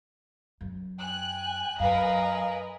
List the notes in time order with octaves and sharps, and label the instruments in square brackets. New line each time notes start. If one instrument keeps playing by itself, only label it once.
[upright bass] F#2
[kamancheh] G5 G#5 [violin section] F#6
[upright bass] F#2 [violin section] A#4 B4 A#5 [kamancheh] D#5 G#5 [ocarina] F5